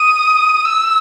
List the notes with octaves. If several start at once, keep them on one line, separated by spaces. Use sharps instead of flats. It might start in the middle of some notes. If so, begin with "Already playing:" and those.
Already playing: D#6
E6